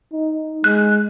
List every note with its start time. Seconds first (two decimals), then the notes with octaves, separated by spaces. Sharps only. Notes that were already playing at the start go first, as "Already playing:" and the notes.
0.12 D#4
0.64 G#3 F#6